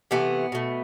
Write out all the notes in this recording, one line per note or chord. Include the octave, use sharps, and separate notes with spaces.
C3 E3 A3 B3
B2 A3